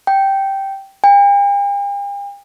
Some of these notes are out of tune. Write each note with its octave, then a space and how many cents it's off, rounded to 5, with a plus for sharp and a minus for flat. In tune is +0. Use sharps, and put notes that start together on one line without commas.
G5 -5
G5 +45